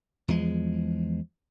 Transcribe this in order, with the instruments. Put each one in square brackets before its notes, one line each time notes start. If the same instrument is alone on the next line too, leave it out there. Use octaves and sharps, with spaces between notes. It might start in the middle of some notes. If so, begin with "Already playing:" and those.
[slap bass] E2 F3 G#3